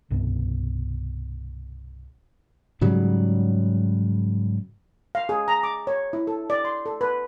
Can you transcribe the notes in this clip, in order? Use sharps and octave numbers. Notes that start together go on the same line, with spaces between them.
C2 G2 B2
G#2 C#3 F#3 G3
F5
G#4
A#5
D6
C#5
E4
A4
D5
C6
A4
B4